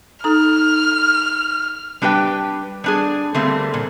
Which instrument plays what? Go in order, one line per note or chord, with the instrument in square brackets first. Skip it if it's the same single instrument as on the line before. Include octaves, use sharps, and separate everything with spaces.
[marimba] D#4 A4 A#5 [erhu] F6
[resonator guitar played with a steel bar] G3 D4 G4 B4 G5
G3 D4 G#4
D3 G3 A3 A#3 C4
A#2